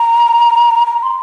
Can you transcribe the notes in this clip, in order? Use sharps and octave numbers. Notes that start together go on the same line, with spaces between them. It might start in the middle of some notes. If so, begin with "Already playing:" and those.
Already playing: A#5
A#5
C6